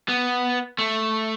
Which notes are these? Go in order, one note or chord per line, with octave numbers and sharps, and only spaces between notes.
B3
A3